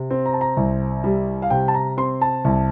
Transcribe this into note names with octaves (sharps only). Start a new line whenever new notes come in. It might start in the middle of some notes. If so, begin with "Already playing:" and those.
Already playing: C3
C4
A#5
A5
A#5
C2
G3
F5
C3 G5
A5
A#5
C4 C6
A5
C2